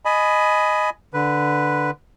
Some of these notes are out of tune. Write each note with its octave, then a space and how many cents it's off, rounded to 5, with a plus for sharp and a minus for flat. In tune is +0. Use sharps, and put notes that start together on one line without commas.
D#5 -5 G#5 +20 B5 +5
D3 +0 B4 +0